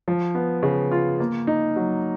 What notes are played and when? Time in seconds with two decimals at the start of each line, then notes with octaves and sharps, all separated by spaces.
0.08 F3
0.35 B3
0.63 C#3
0.91 F4
1.20 A#3
1.47 D#4
1.76 F#3